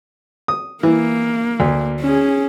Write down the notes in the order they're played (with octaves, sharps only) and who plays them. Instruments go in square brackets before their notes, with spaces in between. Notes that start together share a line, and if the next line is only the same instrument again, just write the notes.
[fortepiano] D#6
[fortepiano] E3 [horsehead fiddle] A#3
[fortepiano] D2
[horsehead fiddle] C#4 G#4